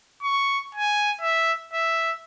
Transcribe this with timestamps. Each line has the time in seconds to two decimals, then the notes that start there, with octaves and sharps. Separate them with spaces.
0.23 C#6
0.75 G#5
1.21 E5
1.73 E5